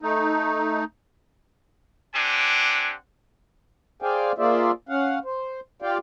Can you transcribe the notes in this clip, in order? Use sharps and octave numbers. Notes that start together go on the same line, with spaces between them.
A3 D#4
C4 D4 G4 F#5 G#5
G#4 C5 D5 F5 G5 G#5
A#3 F4 G#4 C5 D5 E5
C#4 F5 F#5
C5
F4 G4 D5 F5 G5